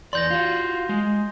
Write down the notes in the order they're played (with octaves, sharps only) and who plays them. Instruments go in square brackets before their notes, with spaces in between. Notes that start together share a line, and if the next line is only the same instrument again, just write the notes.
[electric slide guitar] E2 D5 [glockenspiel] C6 G6 A#6
[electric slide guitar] F4 F#4
G#3